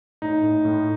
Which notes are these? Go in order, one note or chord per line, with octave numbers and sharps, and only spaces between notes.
A2 D#4
A2
A2